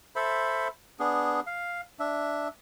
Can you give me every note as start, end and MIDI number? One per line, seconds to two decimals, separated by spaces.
0.16 0.68 69
0.16 0.68 72
0.16 0.68 76
0.16 0.68 83
1.00 1.40 59
1.00 1.40 62
1.00 1.40 68
1.47 1.81 77
2.00 2.48 62
2.00 2.48 76